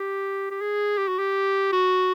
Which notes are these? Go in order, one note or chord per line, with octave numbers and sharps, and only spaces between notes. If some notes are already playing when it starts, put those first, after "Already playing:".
Already playing: G4
G4
G#4
G4
F#4
G4
F#4